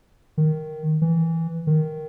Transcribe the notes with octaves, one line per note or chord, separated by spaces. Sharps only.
D#3
E3
D#3